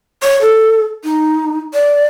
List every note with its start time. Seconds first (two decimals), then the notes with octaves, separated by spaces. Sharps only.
0.23 C#5
0.41 A4
1.04 D#4
1.74 D5